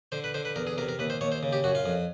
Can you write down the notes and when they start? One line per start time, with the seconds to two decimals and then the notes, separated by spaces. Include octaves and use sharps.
0.12 D3 C5
0.24 B4
0.34 D3 C5
0.45 B4
0.56 E2 A#4
0.67 G#4
0.78 C3 A#4
0.89 A#4
0.99 D#2 B4
1.10 C5
1.21 D#2 C#5
1.32 C5
1.43 C#3
1.53 G4
1.64 F#2 F#4
1.75 F4
1.86 F2